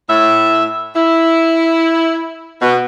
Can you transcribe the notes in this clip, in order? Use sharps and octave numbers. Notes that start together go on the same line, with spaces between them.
A2 E5
E4
B2